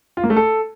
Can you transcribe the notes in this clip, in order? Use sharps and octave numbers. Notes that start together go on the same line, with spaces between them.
F4
A#3
A3
A4